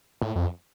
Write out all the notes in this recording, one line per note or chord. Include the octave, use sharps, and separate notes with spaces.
A2
F2